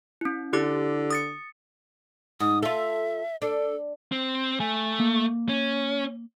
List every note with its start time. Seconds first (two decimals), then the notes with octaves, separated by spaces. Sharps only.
0.21 C#4 E4
0.53 D3 E4 G4 D6
1.11 D#6 A6 C#7
2.40 G#2 D#6
2.63 F4 A4 E5
3.42 D4 A4
4.12 C4
4.60 A3 G#5
5.00 A#3
5.49 C#4